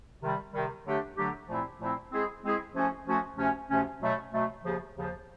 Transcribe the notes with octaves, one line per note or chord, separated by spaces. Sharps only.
C3 D#3 G3
C3 D#3 G3
D3 F#3 A3 D4 G4
D3 F#3 A3 D4 G4
A#2 F3 A3 C4 E4
A#2 F3 A3 C4 E4
G#3 C4 E4 G#4
G#3 C4 E4 G#4
F3 A3 C#4 F#4
F3 A3 C#4 F#4
D2 C3 F3 A3 C#4
D2 C3 F3 A3 C#4
B2 F#3 A3
B2 F#3 A3
D#2 C#3 F3
D#2 C#3 F3